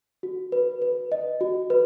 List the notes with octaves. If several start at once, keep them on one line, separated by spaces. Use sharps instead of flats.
F#4
B4
B4
D#5
F#4
B4